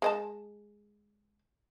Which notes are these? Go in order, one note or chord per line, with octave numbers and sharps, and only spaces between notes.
G#3 D#5 A5